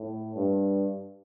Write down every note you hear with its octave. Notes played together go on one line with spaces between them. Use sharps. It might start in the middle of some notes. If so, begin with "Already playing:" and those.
Already playing: A2
G2